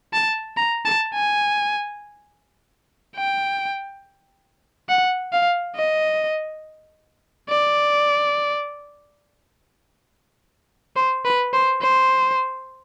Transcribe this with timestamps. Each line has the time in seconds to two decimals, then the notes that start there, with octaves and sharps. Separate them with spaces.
0.13 A5
0.57 A#5
0.85 A5
1.14 G#5
3.17 G5
4.89 F#5
5.32 F5
5.76 D#5
7.49 D5
10.96 C5
11.25 B4
11.53 C5
11.82 C5